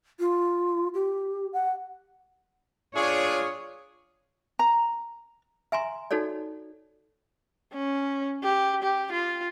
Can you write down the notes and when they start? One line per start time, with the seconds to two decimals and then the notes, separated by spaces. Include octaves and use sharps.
0.20 F4
0.94 G4
1.53 F#5
2.96 D4 F4 G#4 C#5
4.59 A#5
5.72 E5 G#5 A#5 C6
6.11 D#4 F#4 A4 C#5 D5
7.73 C#4
8.43 G4
8.83 G4
9.12 F4